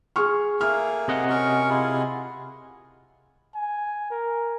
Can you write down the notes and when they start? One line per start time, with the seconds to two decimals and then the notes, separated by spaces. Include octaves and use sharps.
0.16 G#4 C#6 F6
0.61 A3 A#3 G#4 F6
1.08 C3 D#5 F#5
1.30 C#4 A#4 C#6
1.70 E4 F4 G#4
3.55 G#5
4.11 A#4